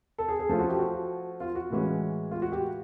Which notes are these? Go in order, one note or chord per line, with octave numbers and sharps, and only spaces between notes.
A4
G#4
G#4
F3 A3 C#4 F4 A4
F#4
G4
F#4
F4
F#4
A2 E3 G#3 C#4
F4
F#4
G4